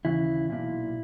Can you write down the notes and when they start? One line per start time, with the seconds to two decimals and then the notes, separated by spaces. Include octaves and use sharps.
0.05 D#2 C#3 E3 E4
0.49 B1 A#2 E4